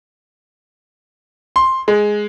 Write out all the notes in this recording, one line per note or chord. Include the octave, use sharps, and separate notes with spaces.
C6
G#3